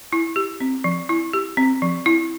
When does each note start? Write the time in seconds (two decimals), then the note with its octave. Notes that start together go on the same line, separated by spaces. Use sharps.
0.13 E4
0.36 G4
0.60 C4
0.84 F3
1.09 E4
1.33 G4
1.57 C4
1.82 F3
2.06 E4